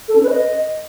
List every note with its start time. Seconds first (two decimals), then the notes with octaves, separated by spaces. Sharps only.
0.08 A4
0.16 C#4
0.23 B4
0.30 D#5